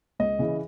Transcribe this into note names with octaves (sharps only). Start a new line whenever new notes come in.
C#2 D#5
C#3 E3